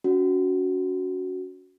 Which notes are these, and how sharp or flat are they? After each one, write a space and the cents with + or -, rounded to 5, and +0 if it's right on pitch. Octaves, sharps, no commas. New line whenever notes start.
C#4 +35 F#4 +0